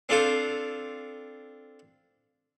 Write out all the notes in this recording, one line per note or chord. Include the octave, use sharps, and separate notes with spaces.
C4 D4 F4 A4 C5